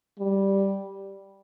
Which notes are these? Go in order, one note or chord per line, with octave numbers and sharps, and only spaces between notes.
G3